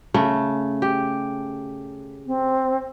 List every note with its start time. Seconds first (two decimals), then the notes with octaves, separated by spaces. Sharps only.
0.14 C#3 A3
0.82 G4
2.27 C4